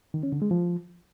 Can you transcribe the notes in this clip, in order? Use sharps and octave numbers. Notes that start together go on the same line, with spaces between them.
D#3
C#4
D3
G#3
F3